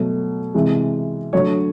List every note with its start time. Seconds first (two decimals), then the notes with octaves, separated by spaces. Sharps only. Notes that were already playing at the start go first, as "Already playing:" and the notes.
Already playing: B2 F#3 A3
0.54 C3 E3 G#3
1.33 D3 F#3 A3 C#5